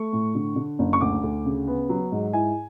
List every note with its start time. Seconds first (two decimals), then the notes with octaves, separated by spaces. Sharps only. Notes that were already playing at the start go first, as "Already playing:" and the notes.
Already playing: A3 C#6
0.13 A2
0.35 D3
0.56 D3
0.79 F#1
0.93 C#6
1.01 D2 D6
1.23 D2
1.45 C#3
1.67 B3
1.89 F#3
2.12 G#2
2.33 E4 G#5